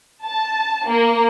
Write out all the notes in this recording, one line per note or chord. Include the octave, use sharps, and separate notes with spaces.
A5
A#3